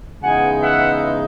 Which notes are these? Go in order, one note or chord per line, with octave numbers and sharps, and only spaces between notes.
C#3 E3 G#3 B3 D#4 F#5 G#5
E5 F#5